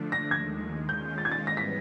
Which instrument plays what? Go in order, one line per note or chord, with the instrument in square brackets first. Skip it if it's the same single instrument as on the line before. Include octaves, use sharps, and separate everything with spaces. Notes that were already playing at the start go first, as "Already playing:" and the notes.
Already playing: [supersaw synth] D3 F3 A3 D4
[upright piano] A#6
[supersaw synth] D#2 D#3 G#3 [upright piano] G#6
[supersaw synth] D#3 G#3 C#4 F4 [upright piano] G6
[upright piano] A6
G#6
A6
[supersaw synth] G#2 E3 G3 B3 [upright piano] A#6
[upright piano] B6